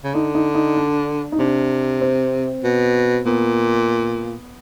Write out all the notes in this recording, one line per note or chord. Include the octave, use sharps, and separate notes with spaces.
C#3
D3 D#4
D#4
D#4
D4
D#4
C3 D4
C4
B2
A#2 B3